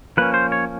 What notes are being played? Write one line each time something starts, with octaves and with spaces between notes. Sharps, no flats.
F3 A#3 C#4 B4
C5
C#5